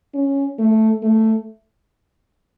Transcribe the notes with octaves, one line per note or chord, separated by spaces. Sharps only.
C#4
A3
A3